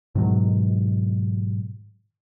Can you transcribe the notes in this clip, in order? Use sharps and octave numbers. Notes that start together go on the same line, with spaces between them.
G#2 B2 D#3 F#3